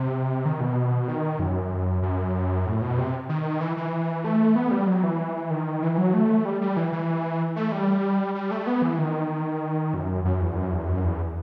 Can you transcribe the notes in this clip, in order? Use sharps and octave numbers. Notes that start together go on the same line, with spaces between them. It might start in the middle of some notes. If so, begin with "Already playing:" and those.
Already playing: C3
D#3
B2
D#3
F#2
F#2
A2
B2
C3
D#3
E3
E3
A3
B3
G3
F#3
E3
D#3
E3
F#3
A3
G3
G3
E3
E3
A3
G3
G3
A3
B3
E3
D#3
F#2
F#2
E2
F#2
E2
F#2
E2